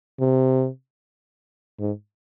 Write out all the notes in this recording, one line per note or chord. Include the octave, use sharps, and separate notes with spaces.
C3
G#2